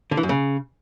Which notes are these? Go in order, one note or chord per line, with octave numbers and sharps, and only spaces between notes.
D3
E3
F#2
C#3